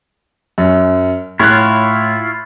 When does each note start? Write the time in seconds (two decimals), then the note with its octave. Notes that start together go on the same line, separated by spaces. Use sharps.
0.58 F#2
1.39 A2 E4 F4 C#5 F6 F#6